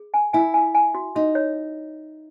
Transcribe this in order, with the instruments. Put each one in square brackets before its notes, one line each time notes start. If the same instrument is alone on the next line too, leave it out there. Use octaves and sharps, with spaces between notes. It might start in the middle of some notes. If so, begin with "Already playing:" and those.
Already playing: [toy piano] G#4
G#5
[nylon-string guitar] E4 [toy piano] G#5
[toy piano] G#5
G#5
F#4
[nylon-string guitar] D#4 [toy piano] F#4
[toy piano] C#5